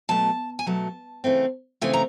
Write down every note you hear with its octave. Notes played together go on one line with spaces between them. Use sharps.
B2 F#3 A3 A5
G#5
B2 F#3 A3 A5
C#3 E3 A3 C4
C#3 E3 A3 C4 G#5
A#5